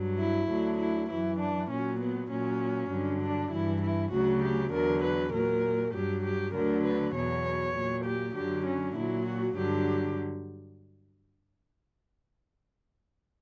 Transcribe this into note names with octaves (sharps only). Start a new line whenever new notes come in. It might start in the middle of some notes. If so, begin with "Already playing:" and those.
Already playing: G2 F#3
E4
D2 D3 F#3
E4
F#2 E3 E4
D4
A#2 F#3 C#4
B3
A#2 F#3 C#4
G2 D3 F#3
D4
G2 E3 E4
E4
D2 C#3 F#3 F#4
G4
E2 D3 F#3 A#4
B4
A#2 F#3 A#4
G2 F#3 G4
G4
D2 D3 F#3 A#4
B4
E2 B2 F#3 C#5
A#2 F#3
G4
F#2 D3 F#3 G4
C#4
A#2 F#3 E4
F#4
G2 D3 F#3 G4